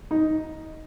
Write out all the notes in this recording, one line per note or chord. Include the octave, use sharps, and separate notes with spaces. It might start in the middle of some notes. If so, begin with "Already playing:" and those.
D#4